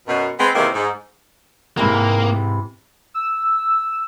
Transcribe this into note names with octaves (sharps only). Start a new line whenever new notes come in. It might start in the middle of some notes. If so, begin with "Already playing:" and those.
F#2 B2
G#3 B3 C4
C3 D#3 E3 G#3 A#3
G#2
G#2 C3 E3 A#3
E6